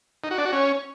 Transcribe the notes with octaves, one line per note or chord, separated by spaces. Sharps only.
D#4
F#4
D4
F#4
C#4